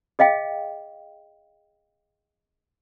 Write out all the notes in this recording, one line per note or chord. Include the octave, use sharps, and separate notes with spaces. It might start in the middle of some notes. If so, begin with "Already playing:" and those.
G#4 D#5 F5 G5